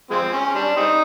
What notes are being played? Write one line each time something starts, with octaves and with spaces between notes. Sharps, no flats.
F3 G#3 C4
C#4
G3 D4
G3 C4 D#4